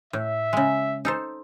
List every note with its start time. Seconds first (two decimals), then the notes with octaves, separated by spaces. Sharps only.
0.13 A2 E5
0.53 C#3 G#3
1.05 D#4 A4 C5